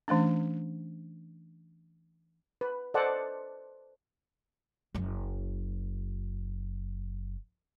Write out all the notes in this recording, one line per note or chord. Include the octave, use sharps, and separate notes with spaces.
E3 A3 C#4 D4
B4
A4 C5 D5 D#5 F#5 A5
F#1 F#2